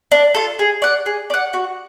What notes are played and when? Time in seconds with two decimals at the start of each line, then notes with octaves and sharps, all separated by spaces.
0.12 D4
0.35 F4 A4
0.59 G#4
0.82 D5 F#5
1.06 G#4
1.30 D5 F#5
1.53 F#4